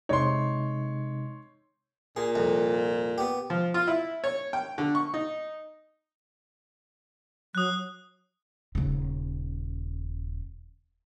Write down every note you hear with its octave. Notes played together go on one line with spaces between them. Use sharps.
C3 G#3 D#4 C#5 C6
A#2 G#4
C2 F2
B3 G4
F3
F4
E4
C#5
G5
D3
C#6
D#4
F#3 D#6 F#6
D#1 C#3